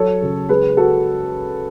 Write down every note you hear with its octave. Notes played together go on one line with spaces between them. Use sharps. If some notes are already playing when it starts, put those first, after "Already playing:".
Already playing: F#3 A4 C#5
C#3
G#3 G#4 B4
F#4 A4